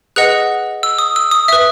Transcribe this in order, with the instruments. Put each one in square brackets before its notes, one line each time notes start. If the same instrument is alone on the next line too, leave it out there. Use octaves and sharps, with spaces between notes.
[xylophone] G#4 B4 D#5 F#5 F#6
E6
D#6
E6
D#6
E5 D#6
B4